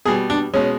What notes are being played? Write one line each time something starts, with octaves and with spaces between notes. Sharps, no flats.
B2 G3 G#4
D4
B2 G#3 C#4